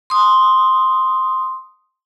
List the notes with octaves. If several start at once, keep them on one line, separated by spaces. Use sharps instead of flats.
C6 D#6